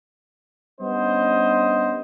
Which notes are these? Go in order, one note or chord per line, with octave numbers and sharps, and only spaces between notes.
G3 B3 C#4 D4 C5 D#5